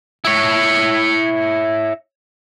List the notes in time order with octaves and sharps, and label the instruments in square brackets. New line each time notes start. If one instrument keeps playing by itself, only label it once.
[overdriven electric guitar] E4 C#5